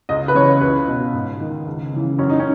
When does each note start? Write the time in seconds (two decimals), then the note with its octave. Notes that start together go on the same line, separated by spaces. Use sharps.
0.09 C#2 D#5
0.28 B4
0.35 C#3 E3 C#5
0.61 C#2 B4
0.88 B2
1.13 G#2
1.41 D#3
1.66 C#2
1.93 C#3 E3
2.18 F#2 C#4
2.30 D#4
2.40 C#4